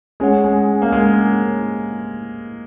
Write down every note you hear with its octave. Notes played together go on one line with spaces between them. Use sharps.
G#3 C#4 G#4 C#5 F#5
G#3
A#3
G#3